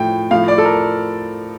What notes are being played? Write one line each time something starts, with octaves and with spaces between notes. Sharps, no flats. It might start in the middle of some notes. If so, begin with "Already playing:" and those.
Already playing: A2 F3 G5
A2 F3 F5
D5
A4
A#4